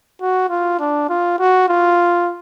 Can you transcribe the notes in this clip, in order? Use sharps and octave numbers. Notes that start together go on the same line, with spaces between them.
F#4
F4
D4
F4
F#4
F4